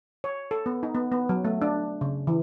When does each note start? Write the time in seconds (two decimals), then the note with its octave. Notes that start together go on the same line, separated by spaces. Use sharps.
0.24 C#5
0.51 A4
0.66 B3
0.83 D#4
0.95 B3
1.12 B3
1.29 F#3
1.45 A3
1.62 D4
2.01 C#3
2.27 E3